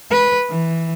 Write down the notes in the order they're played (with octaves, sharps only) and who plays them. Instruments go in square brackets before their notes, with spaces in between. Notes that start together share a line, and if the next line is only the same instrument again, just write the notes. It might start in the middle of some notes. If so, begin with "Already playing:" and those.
[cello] B4
E3